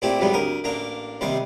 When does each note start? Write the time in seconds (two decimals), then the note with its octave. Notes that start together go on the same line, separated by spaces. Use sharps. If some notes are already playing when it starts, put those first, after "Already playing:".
0.02 A#2 A3 C4 E4 G4
0.20 F2 G#2 F#3 G3 B3
0.33 D2 A#4 D#6
0.64 A1 A#3 D4 A#5
1.21 D#2 C3 G3 D#4 C6